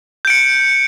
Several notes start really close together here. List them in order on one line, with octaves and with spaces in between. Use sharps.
G6 D7 C#7